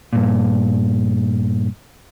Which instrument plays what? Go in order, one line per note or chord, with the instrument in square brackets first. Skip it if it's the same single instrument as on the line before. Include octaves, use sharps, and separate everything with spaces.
[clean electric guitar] G2 A#2